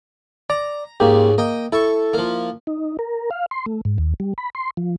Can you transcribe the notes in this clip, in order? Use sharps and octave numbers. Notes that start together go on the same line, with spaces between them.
D5 A#5
C#2 G#2 C#3 A#3 G4
A#3 D#5 G5
E4 A4 C#6
F3 A#3
D#4
A#4
F5
C6
A3
G#2
D#2
G3
B5
C6
F3